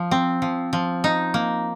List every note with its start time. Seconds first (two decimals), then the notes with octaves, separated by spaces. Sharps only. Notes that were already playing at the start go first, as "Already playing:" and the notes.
Already playing: F3
0.11 C4
0.42 F3
0.73 F3
1.04 D#4
1.34 A#3